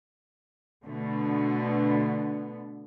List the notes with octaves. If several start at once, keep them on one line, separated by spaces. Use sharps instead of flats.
B2 D3 A3 B3